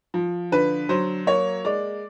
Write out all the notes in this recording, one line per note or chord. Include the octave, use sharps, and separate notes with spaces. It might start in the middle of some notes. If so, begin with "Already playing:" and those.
F3
D3 B4
F#3 C5
A#3 C#5
G#3 D5